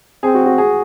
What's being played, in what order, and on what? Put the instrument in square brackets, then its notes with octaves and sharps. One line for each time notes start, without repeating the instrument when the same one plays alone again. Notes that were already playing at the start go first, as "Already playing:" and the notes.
[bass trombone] C4 [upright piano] G#4
[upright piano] F#4
F#4
G#4